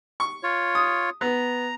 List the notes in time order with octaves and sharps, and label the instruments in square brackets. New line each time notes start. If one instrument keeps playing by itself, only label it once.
[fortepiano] C#6
[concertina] F4 C#5
[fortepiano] D#6
[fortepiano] B3 [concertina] A#5